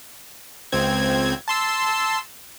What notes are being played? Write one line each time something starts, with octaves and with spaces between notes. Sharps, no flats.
C#2 C4 G#6
A5 C6 E6